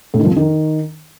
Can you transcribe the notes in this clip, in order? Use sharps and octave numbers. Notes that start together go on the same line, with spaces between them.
A2
D#3
F3
F2
D#3